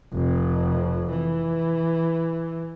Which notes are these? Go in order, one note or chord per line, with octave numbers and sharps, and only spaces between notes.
F1 F2
E3